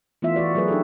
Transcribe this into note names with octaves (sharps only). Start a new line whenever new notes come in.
E3 A3 B3 F4 E5
E3 F#4 D5
F#3 A3 G#4 A#4 B4 D5
D4 D#4 G4 A4